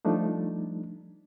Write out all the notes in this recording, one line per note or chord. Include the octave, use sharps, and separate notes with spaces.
F3 G3 A3 D4 D#4